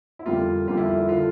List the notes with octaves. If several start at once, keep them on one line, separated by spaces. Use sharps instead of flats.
E4
F2 D3 G3 A#3 F4
F2 D3 G3 A#3 F4
E4
E4
D3 F4